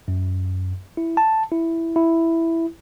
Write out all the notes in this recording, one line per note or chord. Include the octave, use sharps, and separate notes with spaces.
F#2
E4
A5
E4
E4